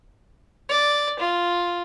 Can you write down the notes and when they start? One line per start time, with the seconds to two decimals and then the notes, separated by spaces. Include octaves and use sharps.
0.69 D5
1.20 F4